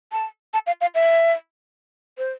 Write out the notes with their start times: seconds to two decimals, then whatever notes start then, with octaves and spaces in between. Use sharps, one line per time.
0.12 A5
0.54 A5
0.67 F5
0.81 F5
0.95 E5
2.18 C5